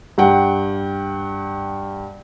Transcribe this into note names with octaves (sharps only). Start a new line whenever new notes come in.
G2 F#5 G5